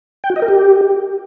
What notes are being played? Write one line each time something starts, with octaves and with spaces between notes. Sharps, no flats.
G5
F#4
D#5
A#4
G4